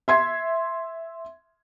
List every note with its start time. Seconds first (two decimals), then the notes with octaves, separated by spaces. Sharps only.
0.08 E5 C6 G#6